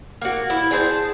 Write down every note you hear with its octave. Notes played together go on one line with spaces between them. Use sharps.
A#3 F#4
E4
D4 G#4 C5 A5